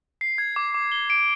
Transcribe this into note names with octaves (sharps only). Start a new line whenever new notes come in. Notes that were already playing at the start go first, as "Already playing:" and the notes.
C7
G#6
D6
D6
G7
D7